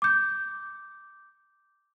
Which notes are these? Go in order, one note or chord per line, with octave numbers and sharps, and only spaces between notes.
D6 G6